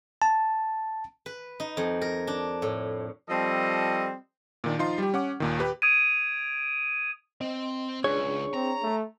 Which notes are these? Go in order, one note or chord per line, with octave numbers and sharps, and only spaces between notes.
A5
B4
D#4
F2
A#4
D4
A2
F3 G3 C4 A4 D#5
A#2 D#3 D4
F3 D#4 F4 C6
G3 G4
C#4 F#5 D6
D#2 A#2 D#3
G4 B4
D#6 G#6 D7 D#7
C4 D#5
C#2 D4 G#4 C#5
C4 A#5
A3